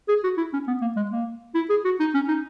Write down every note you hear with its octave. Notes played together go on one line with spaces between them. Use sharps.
G#4
F#4
E4
C#4
B3
A#3
G#3
A#3
E4
G#4
F#4
D#4
C#4
D#4